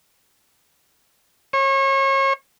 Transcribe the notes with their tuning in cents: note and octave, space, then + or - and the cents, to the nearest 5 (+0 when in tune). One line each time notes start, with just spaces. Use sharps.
C#5 -35